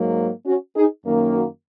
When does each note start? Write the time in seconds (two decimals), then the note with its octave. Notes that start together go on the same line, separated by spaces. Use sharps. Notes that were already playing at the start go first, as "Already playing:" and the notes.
Already playing: G#2 F#3 A#3
0.46 C#4 F#4
0.76 D#4 G#4
1.05 F#2 D#3 A#3
1.33 F#4 A#4